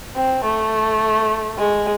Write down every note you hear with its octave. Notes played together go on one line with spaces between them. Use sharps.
C4
A3
G#3